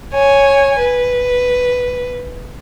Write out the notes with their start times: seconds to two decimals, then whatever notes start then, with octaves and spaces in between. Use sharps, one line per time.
0.14 C#5 G#5
0.79 B4